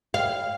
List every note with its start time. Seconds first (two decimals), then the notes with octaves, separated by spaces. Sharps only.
0.14 F5